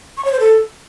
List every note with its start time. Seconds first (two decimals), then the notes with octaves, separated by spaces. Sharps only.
0.17 C#6
0.25 C#5
0.32 C5
0.40 A4